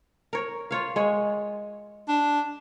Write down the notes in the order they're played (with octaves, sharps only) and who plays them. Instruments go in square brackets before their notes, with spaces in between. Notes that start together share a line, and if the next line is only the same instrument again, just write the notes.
[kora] A#4 C#5
F4 C#5 F5
G#3 C#5
[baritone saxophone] D4